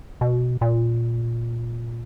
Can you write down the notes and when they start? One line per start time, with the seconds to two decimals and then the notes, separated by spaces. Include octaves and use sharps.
0.21 B2
0.61 A#2